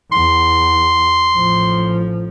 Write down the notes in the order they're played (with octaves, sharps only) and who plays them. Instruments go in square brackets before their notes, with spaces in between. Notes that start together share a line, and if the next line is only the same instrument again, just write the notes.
[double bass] E2 [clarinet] C6
[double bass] A1 F3